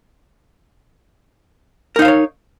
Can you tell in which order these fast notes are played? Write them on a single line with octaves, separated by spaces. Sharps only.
A#4 D#4 F5 C5 C#5